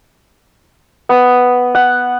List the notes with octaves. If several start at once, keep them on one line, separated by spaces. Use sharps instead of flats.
B3
F#5